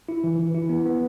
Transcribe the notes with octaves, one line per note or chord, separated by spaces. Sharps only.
E4
E3
E3
E4
B3
B3